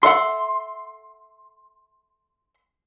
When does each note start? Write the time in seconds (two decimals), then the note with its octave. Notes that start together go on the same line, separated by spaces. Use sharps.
0.03 A4 E5 F#5 C6